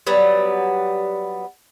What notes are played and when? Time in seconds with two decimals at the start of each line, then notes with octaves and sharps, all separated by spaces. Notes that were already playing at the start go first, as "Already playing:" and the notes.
0.07 F#3 G3 B3